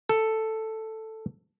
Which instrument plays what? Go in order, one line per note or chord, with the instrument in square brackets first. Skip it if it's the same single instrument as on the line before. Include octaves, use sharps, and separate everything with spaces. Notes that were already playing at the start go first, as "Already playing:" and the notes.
[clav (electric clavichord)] A4